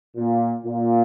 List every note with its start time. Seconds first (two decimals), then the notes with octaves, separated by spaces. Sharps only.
0.14 A#2
0.64 A#2